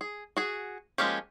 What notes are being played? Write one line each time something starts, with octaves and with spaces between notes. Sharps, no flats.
G#4
F#4 G#4
F3 G#3 A#3 C#4 G4